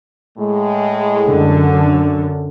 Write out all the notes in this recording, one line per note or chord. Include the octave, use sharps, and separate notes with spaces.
A2 G#3
F#2 D3